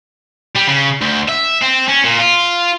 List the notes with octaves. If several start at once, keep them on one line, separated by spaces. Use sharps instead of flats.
G3
C#3
D2
E5
C4
C#4
A#2
F4